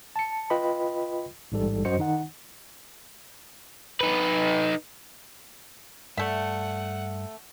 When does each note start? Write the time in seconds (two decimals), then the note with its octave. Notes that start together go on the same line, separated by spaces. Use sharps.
0.16 A5 C#7
0.50 F4 B4 D#5 G5 B5
1.52 A1 G#2 G3 A4
1.85 F#2 F#4 C5 D#5 C#7
1.99 D#3 D#4 F#5
4.01 D#4 B4
6.17 G2 A3 D5 E5 F#5